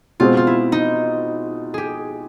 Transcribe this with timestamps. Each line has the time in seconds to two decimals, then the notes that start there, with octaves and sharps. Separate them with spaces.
0.20 B2 G#3 C4 F4
0.37 F4
0.47 E4
0.72 D#4
1.74 G4 G#4